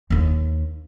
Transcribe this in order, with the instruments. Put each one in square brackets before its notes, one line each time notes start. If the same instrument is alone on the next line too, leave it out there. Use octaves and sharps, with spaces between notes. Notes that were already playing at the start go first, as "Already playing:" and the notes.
[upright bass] D#2 D#4